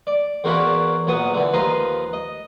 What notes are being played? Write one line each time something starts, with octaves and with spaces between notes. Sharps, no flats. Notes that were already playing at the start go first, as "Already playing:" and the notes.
D5
E2 A#3 F#4 C5 D5 B5
A#1 F#3 B3 D#6
D3 E3
D#2 F3 B4 A#5 C6 D#6
D#5